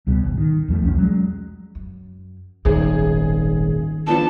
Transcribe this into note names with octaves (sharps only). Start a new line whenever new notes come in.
C#2 B2 G3
G#1
D#3
E2 F3 A3
B1 E2 G3 C#4
F#3 G#3
F#2
D#1 G#1 B2 D#3 G#4
F3 B3 D4 A5